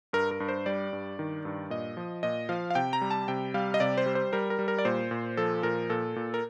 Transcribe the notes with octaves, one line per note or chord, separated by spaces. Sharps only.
G2 A#4
A#4
G2
C5
G3 D5
G2
D#3
G2
A#2 D#5
F3
A#2 D#5
F3 F5
F5
C3 G5
A#5
G3
A5
C3 G5
G3 F5
D#5
C3 D5
C5
G3
C5
G3 A#4
A#4
G3
A#4
D5
A#2 C5
A#2
F3 A4
A#2 A#4
A#2 A4
A#2
A#4